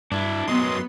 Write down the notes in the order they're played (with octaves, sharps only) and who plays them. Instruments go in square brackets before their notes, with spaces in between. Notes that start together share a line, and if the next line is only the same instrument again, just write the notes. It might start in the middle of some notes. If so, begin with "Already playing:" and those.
[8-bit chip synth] G2 [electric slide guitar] D4 E4
[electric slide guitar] F#2 F#3 D#5 [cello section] B3 [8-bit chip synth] C6